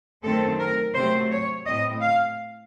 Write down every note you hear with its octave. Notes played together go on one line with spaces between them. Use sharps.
F#2 D#3 A3 C4 A4
A#4
C3 F#3 A3 C4 C5
C#5
A2 A3 C4 D#5
F5